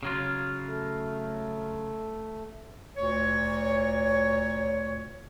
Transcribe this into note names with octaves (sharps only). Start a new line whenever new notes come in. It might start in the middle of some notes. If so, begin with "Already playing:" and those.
C#3 F#3 F4
A3
D2 A#2 C#5